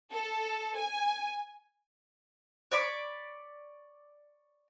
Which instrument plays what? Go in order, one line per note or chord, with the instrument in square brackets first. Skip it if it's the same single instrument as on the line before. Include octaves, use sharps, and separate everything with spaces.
[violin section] A4
G#5
[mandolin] C#5 D5 B5 D6